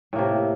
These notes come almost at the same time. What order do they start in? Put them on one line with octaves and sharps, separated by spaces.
A2 A#3 C3